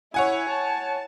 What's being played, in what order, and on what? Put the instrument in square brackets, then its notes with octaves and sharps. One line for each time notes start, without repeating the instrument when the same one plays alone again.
[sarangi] E4 [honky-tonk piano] C#5 F#5 G#5
[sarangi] A5